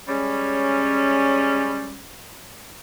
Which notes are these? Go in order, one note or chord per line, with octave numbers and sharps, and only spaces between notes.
G3 G#3 C#4